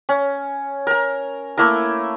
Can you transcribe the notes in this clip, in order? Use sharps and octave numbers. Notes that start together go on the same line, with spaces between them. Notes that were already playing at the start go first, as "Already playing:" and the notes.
C#4
A#4 A#5
A3 A#3 E4 A#4